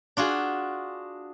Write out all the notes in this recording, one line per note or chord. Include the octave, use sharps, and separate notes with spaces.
D4 F4 F#4 G#4